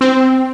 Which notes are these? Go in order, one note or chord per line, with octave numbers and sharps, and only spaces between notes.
C4